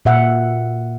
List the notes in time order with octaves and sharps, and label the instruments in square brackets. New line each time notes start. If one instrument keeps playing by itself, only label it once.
[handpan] A#2 E5 F#5